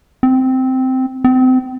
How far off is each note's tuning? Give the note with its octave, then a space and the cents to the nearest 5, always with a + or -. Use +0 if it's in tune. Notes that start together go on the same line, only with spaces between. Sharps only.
C4 -10
C4 -30